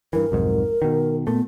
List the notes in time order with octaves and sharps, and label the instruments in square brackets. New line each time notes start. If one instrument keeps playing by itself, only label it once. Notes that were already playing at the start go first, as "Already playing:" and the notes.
[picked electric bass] G2 E3 [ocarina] A#4
[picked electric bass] B1 F2 G#2
B2 D#3
[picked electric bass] A#2 A3 [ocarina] B3